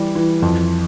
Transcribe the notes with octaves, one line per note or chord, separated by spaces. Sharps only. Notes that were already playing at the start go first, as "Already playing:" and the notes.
Already playing: E3 G3
E3
F2